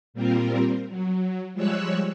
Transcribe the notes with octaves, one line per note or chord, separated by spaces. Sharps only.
A#2 G3 C4 F4 A#4
F#3
F3 G3 G#3 C#5 E6 F#6